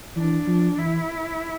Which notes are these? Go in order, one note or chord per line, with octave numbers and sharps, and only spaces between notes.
E3 D4
F3
E3 E4